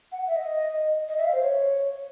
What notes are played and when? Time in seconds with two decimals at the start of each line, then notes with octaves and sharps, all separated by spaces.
0.12 F#5
0.28 E5
0.36 D#5
1.09 D#5
1.18 E5
1.25 F5
1.33 C5
1.42 C#5